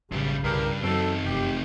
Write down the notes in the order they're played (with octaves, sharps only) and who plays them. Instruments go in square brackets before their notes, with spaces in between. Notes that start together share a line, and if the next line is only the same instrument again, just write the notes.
[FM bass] A1 [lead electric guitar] F#2 G3 [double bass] C#3
[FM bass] C2 [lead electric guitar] G2 [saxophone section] E4 G4 A#4
[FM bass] F#2 [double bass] F#3 [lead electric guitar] C4 D#4 [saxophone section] A4
[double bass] F1 [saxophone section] G4